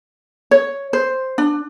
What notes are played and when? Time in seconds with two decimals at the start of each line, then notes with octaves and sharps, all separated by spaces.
0.51 C#5
0.93 C5
1.38 D4